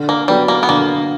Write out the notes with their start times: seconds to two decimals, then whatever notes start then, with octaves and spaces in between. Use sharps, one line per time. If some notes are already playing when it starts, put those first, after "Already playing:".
Already playing: D3
0.09 A#3
0.28 F#3 G3 B3 D4
0.48 A#3
0.63 B3
0.69 D3 A#3